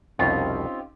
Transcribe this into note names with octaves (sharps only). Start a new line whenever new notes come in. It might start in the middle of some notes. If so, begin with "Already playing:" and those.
C2 F2 B2 C4 C#4 D#4 F4 G4